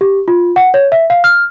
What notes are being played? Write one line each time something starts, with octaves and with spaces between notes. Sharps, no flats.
G4
F4
F#5
C#5
E5
F5
F6